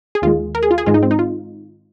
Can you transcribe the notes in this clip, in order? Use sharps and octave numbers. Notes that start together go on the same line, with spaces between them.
G#4
D#2 D#3 G#3 F4
A#4
G#4
F4
G#4
G#2 D#3 G#3 F4
D#4
C4
D#4
F4